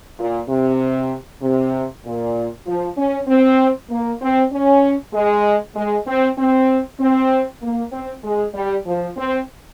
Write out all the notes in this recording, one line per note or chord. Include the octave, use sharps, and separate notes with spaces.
A#2
C3
C3
A#2
F3
C#4
C4
A#3
C4
C#4
G#3
G#3
C4
C4
C4
A#3
C4
G#3
G3
F3
C4